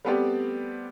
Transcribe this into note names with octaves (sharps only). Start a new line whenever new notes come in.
G3 A3 B3 C4 G4 D5